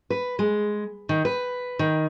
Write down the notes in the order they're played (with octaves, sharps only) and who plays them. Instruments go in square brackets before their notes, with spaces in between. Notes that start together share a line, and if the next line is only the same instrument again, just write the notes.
[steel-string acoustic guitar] B4
G#3
D#3
B4
D#3